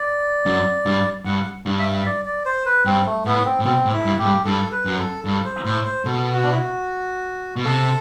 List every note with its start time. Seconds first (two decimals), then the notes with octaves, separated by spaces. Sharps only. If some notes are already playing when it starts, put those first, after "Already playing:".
Already playing: D5
0.46 F#2
0.86 G2
1.25 G2 F#5
1.66 G2
1.79 E5
2.06 D5
2.25 D5
2.46 C5
2.66 B4
2.85 G2 C4
3.06 A3
3.25 A2 B3
3.45 C4
3.60 A2
3.65 B2 C4
3.85 A2
3.92 E4
4.05 G2
4.19 A2 G4
4.25 G2
4.45 G2 A4
4.72 B4
4.85 F#2
4.99 A4
5.25 G2 A4
5.45 C5
5.65 A2 C5
5.85 C5
6.05 B2 A4
6.32 F#4
6.43 D4
6.51 E4
6.59 F#4
7.56 B2
7.65 C3 A4